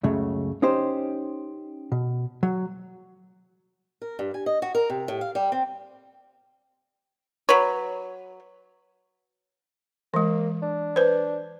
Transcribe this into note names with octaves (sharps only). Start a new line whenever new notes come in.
C#2 F#2 C#3 A3
C#4 D#4 G4 C5
B2
F#3
A#4
G2
G#5
D#5
F#4
A#4
C3
A2
F5
G3
C4
F#3 B4 C#5
E3 G#3 A#3
D4
B4 C5